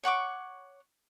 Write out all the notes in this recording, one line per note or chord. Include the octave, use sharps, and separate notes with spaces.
C#5 F#5 C#6 D6